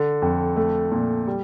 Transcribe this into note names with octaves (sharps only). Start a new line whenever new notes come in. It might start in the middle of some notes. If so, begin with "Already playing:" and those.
Already playing: D3
F2
A3
A#2
G3